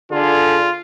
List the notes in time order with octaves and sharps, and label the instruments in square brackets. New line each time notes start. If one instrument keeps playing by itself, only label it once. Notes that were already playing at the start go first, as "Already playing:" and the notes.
[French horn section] D3 G#4 [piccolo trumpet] F4